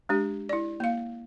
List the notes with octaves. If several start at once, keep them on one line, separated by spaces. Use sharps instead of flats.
G#3 D4 G4
E4 D5
A#3 F5